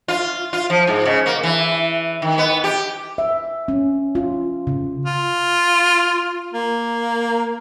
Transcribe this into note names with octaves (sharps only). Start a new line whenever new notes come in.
F4
F4
F3
G#2
C#3
A#3
E3
D#3
B3
G4
E5
C#4
F4
C#3
F4
A#3